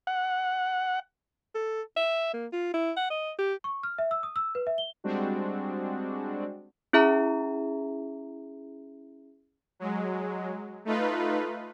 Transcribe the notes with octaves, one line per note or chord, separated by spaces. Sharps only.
F#5
A4
E5
A#3
F4
E4
F#5
D#5
G4
C#6
F6
E5
E6
D#6
E6
B4
E5
G7
G3 G#3 C4 D4 F#4
C#4 E4 G#4 E5 A#5
F#3 G#3
A3 D#4 F4 B4